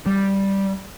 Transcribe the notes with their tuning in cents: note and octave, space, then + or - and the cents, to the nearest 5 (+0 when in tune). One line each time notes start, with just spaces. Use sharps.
G3 -5